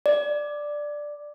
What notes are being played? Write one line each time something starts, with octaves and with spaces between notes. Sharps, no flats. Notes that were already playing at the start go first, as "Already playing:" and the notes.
D5